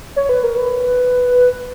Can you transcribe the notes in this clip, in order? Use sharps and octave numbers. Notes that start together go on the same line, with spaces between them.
C#5
B4
A#4
B4